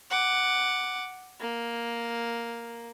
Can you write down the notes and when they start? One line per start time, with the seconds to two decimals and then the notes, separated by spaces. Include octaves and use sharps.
0.10 F#5 D6
1.40 A#3